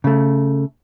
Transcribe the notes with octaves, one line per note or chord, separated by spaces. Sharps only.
C#3 A3